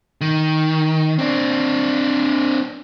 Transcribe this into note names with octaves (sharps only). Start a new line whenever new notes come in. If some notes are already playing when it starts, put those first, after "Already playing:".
D#3
C4 D4